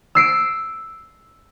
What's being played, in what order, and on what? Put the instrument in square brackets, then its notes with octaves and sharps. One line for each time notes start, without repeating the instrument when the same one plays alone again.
[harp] E6 C7 D7